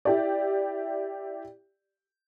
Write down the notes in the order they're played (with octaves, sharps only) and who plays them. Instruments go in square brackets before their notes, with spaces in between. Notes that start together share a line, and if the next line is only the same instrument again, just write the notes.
[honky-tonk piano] E4 G4 D5